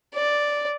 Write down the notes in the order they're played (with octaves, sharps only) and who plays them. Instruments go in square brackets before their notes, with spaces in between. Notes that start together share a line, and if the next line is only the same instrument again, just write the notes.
[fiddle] D5